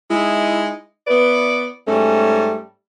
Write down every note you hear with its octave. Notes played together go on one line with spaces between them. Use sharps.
G#3 D#4 E4
B3 E4 B4 D5
G#2 G3 A3 C#4